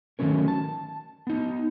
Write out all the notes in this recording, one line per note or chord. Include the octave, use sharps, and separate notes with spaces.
D#3 E3 F#3 A3 C#4 A#4
A5
B3 D#4